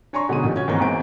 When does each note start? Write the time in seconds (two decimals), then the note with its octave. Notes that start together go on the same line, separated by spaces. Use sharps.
0.13 D4 C#5 G#5 A#5 C6 C#6
0.29 B2 D3 G#3 C#4 D#4 D#7
0.43 A1 A#2 G4
0.55 D2 C#4 F#4 G#6
0.68 G#2 D#3 E3 A#3 C4 A#5
0.80 G#1 E2 G#2 C5 D7